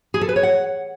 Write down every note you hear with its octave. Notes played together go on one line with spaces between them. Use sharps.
G#4
A4
B4
C#5
F#5